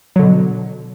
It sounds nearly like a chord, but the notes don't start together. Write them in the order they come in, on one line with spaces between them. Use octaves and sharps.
F#3 D3 B2